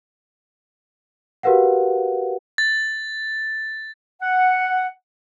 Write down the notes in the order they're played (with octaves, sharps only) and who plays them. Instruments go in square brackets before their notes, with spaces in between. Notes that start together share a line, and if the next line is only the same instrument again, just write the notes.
[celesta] F#4 G4 A#4 B4 F5 F#5
[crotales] A6
[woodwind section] F#5